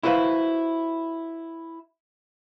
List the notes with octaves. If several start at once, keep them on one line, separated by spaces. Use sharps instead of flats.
E4 F#4 B4 C5 D#5 F5